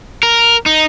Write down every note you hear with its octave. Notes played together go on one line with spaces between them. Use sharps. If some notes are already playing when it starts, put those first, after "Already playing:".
A#4
D#4